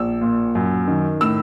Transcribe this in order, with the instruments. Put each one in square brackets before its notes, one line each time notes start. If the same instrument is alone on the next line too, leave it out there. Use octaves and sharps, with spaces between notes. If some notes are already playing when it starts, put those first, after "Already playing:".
Already playing: [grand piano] A#1 E6
A#2
F#2
D#3
A2 E6